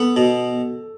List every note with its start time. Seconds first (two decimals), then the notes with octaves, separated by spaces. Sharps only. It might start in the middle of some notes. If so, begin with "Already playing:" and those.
Already playing: B3 A4
0.16 B2